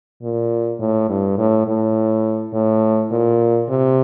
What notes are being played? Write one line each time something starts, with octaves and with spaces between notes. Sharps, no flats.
A#2
A2
G2
A2
A2
A2
A#2
C3